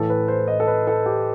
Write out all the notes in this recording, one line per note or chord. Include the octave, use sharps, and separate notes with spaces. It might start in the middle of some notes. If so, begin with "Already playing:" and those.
Already playing: A2 E3 A4
B4
C5
D#5
A4
B4
A4
G4